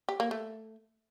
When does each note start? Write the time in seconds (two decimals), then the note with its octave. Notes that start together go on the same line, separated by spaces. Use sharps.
0.09 G4
0.20 A#3
0.31 A3